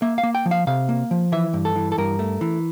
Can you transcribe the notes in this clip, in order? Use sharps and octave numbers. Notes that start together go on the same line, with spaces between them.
A#3 E5
F5
A#3
G5
F3
F5
C3 F5
A#3
F3
E3 E5
G2
A4
E3
A4
G2 A#4
A3
E3